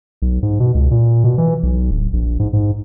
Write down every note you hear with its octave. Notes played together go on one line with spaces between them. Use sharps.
B1
G#2
B2
C#2
A#2
B2
E3
B1
D1
A#1
G#2
G#2